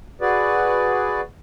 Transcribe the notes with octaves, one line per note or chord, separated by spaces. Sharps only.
F#4 G#4 B4 D5